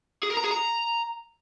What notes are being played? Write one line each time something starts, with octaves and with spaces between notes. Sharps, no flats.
G#4
A#4
A#5
G#4
A#5